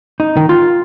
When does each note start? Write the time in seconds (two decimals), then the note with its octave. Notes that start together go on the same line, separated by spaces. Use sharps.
0.20 D#4
0.37 D#3
0.49 F4